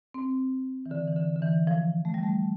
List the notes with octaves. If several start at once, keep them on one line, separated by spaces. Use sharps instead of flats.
C4
E3
D3
E3
D3
D3
E3
F3
A3
G3
A3